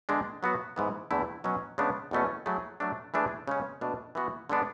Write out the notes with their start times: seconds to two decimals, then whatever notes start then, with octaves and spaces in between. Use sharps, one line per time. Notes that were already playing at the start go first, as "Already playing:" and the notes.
0.09 E2 D3 G#3 D4
0.43 F#3 B3 F#4
0.76 G#2 E3 B3
1.11 E2 D3 A3 E4
1.44 B2 F#3 C#4
1.78 C#3 G#3 B3 D4
2.11 E2 B2 A3 C#4
2.46 F#3 A3 E4 G#4
2.80 F#3 A3 D4
3.14 E3 A3 D4 G#4
3.48 C#3 G#3 C#4
3.81 B2 A3 D4
4.15 E3 B3 F#4
4.49 D3 G#3 B3 D4